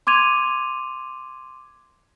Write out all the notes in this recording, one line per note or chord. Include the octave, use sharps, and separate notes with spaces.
C6 D6 G#6 D#7 F7